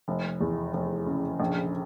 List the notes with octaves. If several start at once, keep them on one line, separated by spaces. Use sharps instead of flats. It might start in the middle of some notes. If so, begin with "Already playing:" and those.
F1
E2
F1
C#3
A#1